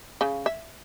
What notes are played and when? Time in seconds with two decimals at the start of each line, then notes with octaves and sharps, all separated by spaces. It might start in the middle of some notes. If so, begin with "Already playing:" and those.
0.21 C#3
0.46 E5